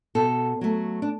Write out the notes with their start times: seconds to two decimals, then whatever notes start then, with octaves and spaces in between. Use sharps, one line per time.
0.15 B2 A4
0.61 F#3 A3
1.02 D4